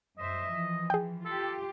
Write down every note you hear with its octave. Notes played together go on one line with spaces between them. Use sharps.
F#2 C5 D#5 E5
E3 F3
G#4 G5
F4 G4 A4